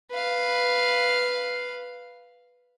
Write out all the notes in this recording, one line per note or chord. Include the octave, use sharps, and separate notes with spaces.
B4 F5